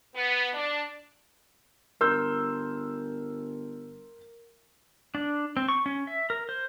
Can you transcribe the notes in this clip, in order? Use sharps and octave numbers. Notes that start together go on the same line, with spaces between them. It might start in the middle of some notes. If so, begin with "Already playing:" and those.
B3
D4
G1 A#4 C6 E6 G6
D4
C4
C#6
C#4
E5
A#4
C5